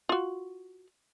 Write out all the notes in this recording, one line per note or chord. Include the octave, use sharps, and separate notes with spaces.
F4 F#4